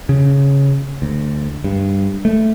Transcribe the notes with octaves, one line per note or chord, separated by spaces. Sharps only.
C#3
D2
G2
A3